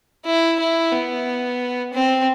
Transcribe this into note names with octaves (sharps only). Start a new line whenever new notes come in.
E4
E4
B3
C4